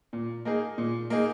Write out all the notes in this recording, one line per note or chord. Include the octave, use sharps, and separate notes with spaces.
A#2
A#3 D#4 G#4
A#2
A#3 D#4 G#4